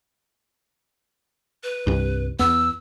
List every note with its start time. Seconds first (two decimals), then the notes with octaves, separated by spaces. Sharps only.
1.63 B4
1.87 C2 G2
2.39 E2 B3 E6